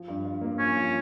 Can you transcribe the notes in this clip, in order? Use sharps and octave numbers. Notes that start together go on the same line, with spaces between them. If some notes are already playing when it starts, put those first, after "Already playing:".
Already playing: F3
G2
F4
A#3
F3 C#4
F3